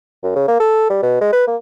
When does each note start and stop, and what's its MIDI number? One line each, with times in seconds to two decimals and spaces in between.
0.23 0.34 42
0.36 0.48 49
0.48 0.59 58
0.60 0.89 69
0.90 1.01 55
1.02 1.18 47
1.21 1.30 56
1.33 1.45 71
1.47 1.56 58